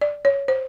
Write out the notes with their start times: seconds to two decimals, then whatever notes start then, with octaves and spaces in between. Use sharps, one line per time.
0.01 D5
0.25 C#5
0.48 C5